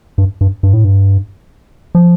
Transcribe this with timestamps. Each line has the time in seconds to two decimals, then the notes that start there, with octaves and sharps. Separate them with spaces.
0.18 G2
0.41 G2
0.63 G2
0.73 A2
0.84 G2
1.95 F3